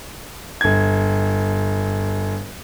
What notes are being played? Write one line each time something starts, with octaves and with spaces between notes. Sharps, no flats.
G1 G#6